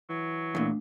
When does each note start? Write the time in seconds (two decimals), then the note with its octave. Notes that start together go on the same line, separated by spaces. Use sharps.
0.09 E3 F#3
0.55 E2 A#2 A3 D4